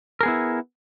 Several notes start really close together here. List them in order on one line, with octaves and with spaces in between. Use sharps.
A#4 G#4 B3 E4